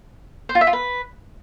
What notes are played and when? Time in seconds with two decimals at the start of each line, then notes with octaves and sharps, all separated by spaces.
0.49 C5
0.55 F4
0.61 E5
0.67 F4
0.73 B4